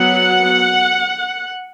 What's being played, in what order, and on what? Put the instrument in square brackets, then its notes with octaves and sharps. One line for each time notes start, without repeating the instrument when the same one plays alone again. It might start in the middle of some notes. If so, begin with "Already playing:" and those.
Already playing: [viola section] F#3 B3 F#5